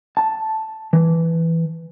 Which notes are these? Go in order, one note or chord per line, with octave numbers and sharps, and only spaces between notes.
A5
E3